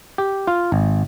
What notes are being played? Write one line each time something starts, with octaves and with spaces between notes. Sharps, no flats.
G4
F4
G#1